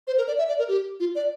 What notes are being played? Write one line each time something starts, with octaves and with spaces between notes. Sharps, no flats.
C5
A#4
D5
E5
D5
A#4
G4
F4
D5